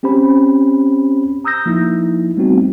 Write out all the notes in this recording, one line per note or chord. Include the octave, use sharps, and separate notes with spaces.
C4 C#4 G4 C5 B5
A#5 D#6 E6 G6 A#6
F3 A#3 D#4 E4
G3 A3 B3 C4 D#4 F#4